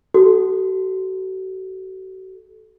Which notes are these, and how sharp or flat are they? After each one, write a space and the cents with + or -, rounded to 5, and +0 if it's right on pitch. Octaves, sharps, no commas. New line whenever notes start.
F#4 +35 A4 -15